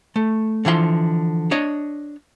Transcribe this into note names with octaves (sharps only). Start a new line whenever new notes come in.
A3
D3 E3 F3 F#5 C6
D4 C#5 D#5